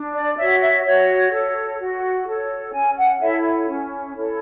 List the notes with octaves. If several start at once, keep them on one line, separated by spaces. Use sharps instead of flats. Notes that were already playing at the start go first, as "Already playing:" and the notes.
Already playing: D4
D5
F#4 C#5 E5
E5
F#4 C#5
A4 C#5
F#4
A4 C#5
C#4 G#5
F#5
E4 A4 C#5 E5
C#4
E4 A4 C#5